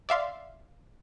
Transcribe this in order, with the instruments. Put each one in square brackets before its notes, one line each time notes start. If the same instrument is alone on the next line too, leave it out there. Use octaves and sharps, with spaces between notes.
[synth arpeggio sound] D5 E5 F5 C6